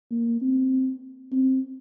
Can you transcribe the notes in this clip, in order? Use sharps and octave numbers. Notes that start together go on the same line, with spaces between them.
A#3
C4
C4